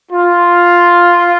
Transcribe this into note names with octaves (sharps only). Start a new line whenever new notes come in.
F4